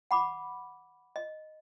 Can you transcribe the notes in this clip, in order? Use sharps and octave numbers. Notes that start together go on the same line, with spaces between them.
F#5 B5 D6
D#5